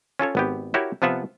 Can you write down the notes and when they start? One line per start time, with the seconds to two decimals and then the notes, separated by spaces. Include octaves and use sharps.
0.19 C#4 F4 A4 C#5
0.35 G#1 B3 G4
0.74 E4 F#4 G4 A#4 C#5
1.02 C3 F3 B3 F4 E5 F#5